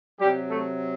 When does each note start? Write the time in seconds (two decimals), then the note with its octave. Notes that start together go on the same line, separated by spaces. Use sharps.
0.20 C3 F#3 G3 G4
0.49 A3 A4